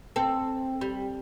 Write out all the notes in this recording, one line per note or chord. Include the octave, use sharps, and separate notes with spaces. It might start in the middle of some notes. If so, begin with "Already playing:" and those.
C4 A4
G3